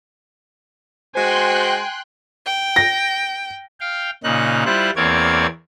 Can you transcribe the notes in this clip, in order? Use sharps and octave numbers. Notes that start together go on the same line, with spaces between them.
G#3 F#4 C5 G5 G#5 C6 F#6
G5
A#6
F5 G5
A#2 C#3 D#4 F#6
G3 E4 F4 C5 F#6
E2 A#3 C4 C#5 D5 G#6